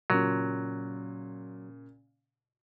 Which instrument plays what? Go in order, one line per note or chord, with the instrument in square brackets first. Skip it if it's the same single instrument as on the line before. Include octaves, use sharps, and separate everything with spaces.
[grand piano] A#2 C#3 [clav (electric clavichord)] F#3